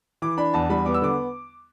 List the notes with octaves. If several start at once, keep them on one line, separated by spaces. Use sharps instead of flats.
E3 D6
D4 B5
E2 A5
G3 B5
B3 D6
E6
D3 D6